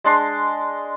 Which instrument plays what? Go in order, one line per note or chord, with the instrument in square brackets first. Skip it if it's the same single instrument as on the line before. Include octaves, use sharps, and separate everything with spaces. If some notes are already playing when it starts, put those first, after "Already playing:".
[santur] G#3 D4 C6